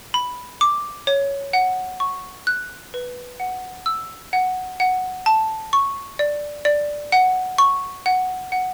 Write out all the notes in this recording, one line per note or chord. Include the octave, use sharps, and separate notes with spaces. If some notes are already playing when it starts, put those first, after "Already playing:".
B5
D6
C#5
F#5
C#6
F#6
B4
F#5
E6
F#5
F#5
A5
C#6
D5
D5
F#5
C#6
F#5
F#5